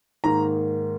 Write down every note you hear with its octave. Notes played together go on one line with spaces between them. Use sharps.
G#2 D#3 A#3 A#5